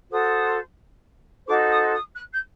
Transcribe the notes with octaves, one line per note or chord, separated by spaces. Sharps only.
F#4 A4 C5 D#6
D#4 F#4 A4 C5 D6
D#6
D#6
F#6
G6